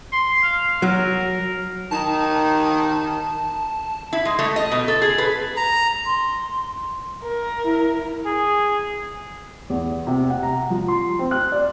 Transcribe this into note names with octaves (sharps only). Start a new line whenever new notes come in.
C6
F5
F#3 A#4
D#3 D#4 A5
E4
G#3
A3
D#5
B2
A4
G#4
B4
A#5
C6
A#4
E4
G#4
E2
C3
F#5
A#5
F3
C6
C4
F#6
D5